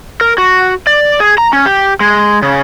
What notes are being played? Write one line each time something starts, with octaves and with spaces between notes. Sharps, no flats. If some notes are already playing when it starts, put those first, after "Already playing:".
A#4
F#4
D5
G#4
A#5
C#4
G4
G#3
C#3